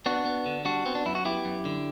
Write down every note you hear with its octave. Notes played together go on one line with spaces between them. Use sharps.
B3 D4 F#4
B3
D3
G3 D4 F#4
B3 C4
D4
F#2 E4
F#4
B3 E4 G4
F#2
D3